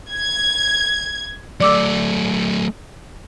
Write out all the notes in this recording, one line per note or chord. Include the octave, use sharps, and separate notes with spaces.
G#6
F#3 A3 D5 D6 E6